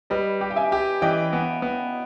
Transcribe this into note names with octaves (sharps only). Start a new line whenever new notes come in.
G3 B4 D#5
G4
G5
E5 G#5
G4
E3 D#5 G5
B3
B3